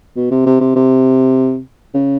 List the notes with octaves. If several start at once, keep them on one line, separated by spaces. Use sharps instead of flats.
B2
C3
C3
C3
C3
C#3